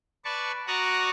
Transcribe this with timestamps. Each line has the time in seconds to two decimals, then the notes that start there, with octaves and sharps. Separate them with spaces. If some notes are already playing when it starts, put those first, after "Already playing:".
0.25 B4 D5 A5 C#6
0.67 F#4 D5 A#5 C#6 D#6 F#6